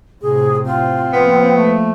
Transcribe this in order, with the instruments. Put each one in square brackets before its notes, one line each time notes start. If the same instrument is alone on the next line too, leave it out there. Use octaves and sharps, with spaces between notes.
[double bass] A2 C3 [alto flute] G#4
[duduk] C4 [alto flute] F4
[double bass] F3 A#3 [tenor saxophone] B3
[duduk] A3